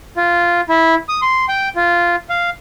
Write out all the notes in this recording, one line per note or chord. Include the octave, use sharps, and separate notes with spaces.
F4
E4
D#6
C6
G5
F4
F5